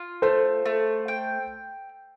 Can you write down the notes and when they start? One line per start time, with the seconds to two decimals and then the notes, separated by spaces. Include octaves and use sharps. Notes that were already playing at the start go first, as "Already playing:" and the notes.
Already playing: F4
0.22 A3 A4 C5
0.65 A3
1.08 G5